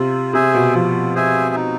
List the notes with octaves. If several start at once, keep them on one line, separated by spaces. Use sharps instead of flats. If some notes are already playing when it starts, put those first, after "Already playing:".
Already playing: C3 F4
C3 G#4 C5 E5 G#5
B2
F3 F4
G#4 C5 E5 G#5
D#4